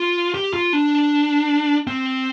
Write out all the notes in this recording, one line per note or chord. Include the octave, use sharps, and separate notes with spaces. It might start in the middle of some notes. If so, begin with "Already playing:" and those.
Already playing: F4
G4
F4
D4
C4